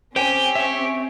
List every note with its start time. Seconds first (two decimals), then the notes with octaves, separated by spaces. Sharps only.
0.16 C4 C#4 G4 C5 G5 G#5
0.55 E5 C#6